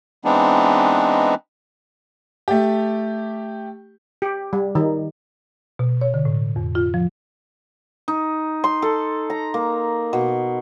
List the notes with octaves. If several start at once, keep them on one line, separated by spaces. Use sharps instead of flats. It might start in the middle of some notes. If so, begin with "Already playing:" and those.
E3 G#3 B3 C4 D4 D#4
A3 G4
G4
G3
D#3
B2
C#5
D3
A2
F2
F4
F3
D#4
C6
A4
A#5
A#3
B2